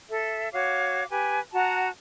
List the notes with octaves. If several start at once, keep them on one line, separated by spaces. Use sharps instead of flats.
A4 E5
F#4 C#5 F5 D6
G4 B4 G#5
F#4 F#5 A5 A#5